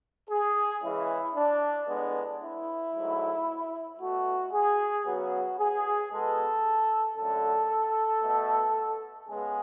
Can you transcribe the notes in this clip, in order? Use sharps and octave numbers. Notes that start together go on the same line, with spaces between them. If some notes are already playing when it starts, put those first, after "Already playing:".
G#4
C#3 E3 G#3 E4
D4
A2 G#3 B3 D4
E4
G#2 F#3 A3
B2 A3 F#4
G#4
C#3 F#3 B3 F#4
G#4
B2 G#3 B3 A4
F#2 D3 A3 A4
B2 A3
C#3 G#3 B3 G#4